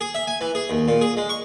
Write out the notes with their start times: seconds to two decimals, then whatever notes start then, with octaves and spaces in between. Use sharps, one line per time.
0.01 G#4
0.15 E5
0.27 G#5
0.41 E3
0.55 G#4
0.70 D#2
0.88 A#2
1.01 G#4
1.17 G#3
1.29 C#6